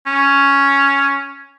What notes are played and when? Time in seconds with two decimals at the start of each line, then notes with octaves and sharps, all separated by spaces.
0.07 C#4